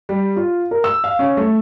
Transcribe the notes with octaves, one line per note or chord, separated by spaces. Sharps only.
G3
F4
A#4
E6
F5
C#4
A3